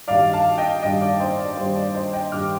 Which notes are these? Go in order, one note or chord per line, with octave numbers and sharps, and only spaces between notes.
G2 D#3 G3 D5 F5
F5 A5
D#5 G5
G2 D#3 G3 D#5 G5
D5 F5
C5 D#5
D5
G2 D#3 G3 C5
D5
C5 D#5
D#5 G5
G2 D#3 G3 D6 F6